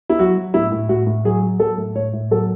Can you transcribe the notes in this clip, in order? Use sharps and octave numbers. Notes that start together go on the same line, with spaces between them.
E4
F#3 F#4
F#3
A2 E4
A2
A2 F#4
A2
F#3 G#4
F#3
F#3 A4
A2
A2 C#5
A2
F#3 A4